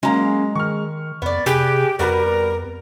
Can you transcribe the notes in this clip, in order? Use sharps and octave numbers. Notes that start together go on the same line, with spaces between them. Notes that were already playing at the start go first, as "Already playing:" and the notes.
F#3 G#3 A#3 C#4 A#5
D#3 C#6 F6
F2 B3 D5
C3 G4 G#4 B4
F2 G3 F#4 A#4 B4
B3